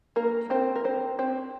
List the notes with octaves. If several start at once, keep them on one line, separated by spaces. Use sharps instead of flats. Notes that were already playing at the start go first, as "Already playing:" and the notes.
A#3 A#4
C4 C5
A#4
C4 C5
C4 C5